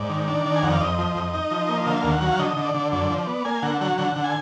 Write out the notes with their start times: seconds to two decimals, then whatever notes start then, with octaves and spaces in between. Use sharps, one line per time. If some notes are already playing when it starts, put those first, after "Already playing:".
Already playing: G#2 D5
0.09 D#3
0.28 D4
0.46 D#3
0.56 G#5
0.62 F2 F#5
0.73 F5
0.81 F2 D#5
0.99 F3
1.15 F2
1.34 D#4
1.51 F3
1.69 A#3
1.86 D3 F5
2.04 D#2
2.13 F#5
2.21 F#3
2.32 F5
2.39 D3 D#5
2.57 D3
2.65 D5
2.74 D3
2.92 F#2 D5
3.11 F3
3.18 D5
3.27 B3
3.45 A#3 G#5
3.63 D3 F#5
3.81 F#3 F#5
3.98 D3 F#5
4.16 D3
4.24 G#5